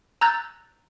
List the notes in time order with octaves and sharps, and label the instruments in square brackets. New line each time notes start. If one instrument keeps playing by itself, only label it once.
[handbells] A#5 E6 F#6 G6 A6